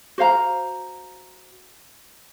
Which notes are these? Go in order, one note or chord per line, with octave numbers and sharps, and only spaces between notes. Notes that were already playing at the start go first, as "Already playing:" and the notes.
F#4 C5 F5 A#5